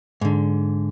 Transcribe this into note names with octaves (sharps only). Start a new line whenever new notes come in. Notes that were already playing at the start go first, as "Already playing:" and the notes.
G#2 D3